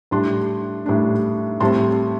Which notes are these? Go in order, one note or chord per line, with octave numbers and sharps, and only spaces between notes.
A2 G3 D4 A5 C6
A2 G3 D4
A2 G3 C4 A5 C6